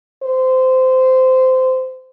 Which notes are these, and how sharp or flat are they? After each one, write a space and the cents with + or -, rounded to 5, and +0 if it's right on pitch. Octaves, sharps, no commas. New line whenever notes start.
C5 -20